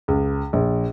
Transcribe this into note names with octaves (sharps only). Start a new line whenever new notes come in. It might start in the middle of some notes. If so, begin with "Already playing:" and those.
C#2
A#1